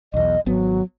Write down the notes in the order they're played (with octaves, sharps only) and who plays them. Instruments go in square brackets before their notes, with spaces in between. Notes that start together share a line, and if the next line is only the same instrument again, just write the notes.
[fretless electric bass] B1 E2 [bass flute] D#5
[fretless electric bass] G#1 B3 [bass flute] F#3